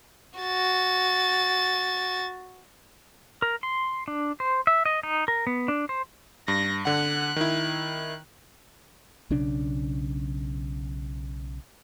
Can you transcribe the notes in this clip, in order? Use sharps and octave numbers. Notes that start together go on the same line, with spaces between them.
F#4 A6
A#4
C6
D4
C5
E5
D#5
D#4
A#4
B3
D4
C5
G2 A#6
D3 F#5 F#6
D#3 E4
B1 C#3 D4